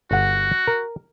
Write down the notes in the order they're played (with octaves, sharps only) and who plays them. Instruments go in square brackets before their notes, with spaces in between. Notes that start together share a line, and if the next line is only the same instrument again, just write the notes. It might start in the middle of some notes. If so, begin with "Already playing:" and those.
[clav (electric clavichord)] G1 F#5 [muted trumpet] F#4
[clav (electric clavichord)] A#4